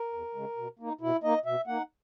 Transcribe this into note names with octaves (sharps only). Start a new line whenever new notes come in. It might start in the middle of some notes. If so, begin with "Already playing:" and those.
Already playing: A#4
E2
C#3 G#3
B2
A#3 D#4
B2 E4
A#3 D#4 D#5
B2 E5
A#3 D#4 F#5